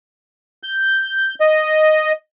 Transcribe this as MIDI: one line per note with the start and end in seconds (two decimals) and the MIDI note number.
0.63 1.35 91
1.40 2.12 75